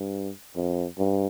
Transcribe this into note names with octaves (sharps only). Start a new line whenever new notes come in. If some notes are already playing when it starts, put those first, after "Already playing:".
Already playing: G2
F2
G2